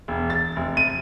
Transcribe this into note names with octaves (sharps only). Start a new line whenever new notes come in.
E1
A6
F1
D#7